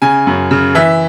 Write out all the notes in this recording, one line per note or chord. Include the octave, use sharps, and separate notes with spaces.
C#3 G#5
F#2
C#3
E3 E5